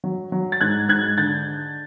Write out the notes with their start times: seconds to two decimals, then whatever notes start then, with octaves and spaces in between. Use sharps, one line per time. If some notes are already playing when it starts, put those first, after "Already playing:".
0.04 F#3
0.32 F#3
0.52 A6
0.60 G#2 F#6 G#6
0.89 G#2 F#6 G#6
1.18 D3 G6 A6